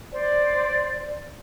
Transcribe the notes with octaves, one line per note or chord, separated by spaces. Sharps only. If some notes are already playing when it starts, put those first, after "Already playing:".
C5 D5